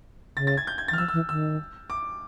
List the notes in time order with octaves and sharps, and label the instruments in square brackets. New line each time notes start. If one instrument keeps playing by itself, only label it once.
[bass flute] C#3 [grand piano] A6
[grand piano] A6
G#6
G6
G#6
A6
[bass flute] E3
[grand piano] F6
[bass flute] F3 [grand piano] E6
[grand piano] E6
[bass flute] E3
[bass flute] D#3 [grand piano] E6
[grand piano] D6